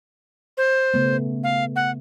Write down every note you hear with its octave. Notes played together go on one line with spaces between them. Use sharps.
C5
C#3 A3 B3
F5
F#5